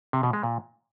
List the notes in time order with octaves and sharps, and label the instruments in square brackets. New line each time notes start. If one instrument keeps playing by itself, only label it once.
[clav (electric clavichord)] C3
B2
G#3
A#2